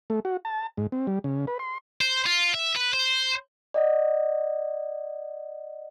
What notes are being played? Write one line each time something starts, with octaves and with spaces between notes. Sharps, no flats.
A3
F#4
A5
G#2
C4
G3
C#3
B4
C6
C5
F4
E5
B4
C5
D5 D#5 F#5